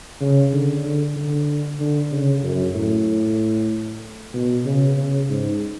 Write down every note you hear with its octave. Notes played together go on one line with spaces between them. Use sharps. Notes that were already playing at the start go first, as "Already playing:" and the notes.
C#3
D3
D3
D3
D3
C#3
F#2
A2
B2
C#3
C#3
G#2